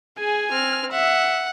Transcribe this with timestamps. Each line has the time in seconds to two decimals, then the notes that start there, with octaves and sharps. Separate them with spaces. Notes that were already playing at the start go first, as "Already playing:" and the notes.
0.18 G#4 G#5
0.52 C4 F6
0.91 E5 F#5